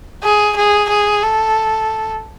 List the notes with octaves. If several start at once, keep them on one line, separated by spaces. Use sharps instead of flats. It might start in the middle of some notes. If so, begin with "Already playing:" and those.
G#4
G#4
G#4
A4